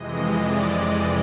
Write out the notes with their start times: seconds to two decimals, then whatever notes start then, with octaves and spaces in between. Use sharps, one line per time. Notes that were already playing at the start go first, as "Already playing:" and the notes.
Already playing: F2 C3 E3 G#3 D#5
0.39 D5